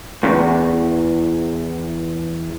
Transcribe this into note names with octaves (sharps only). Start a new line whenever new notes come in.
B1 E2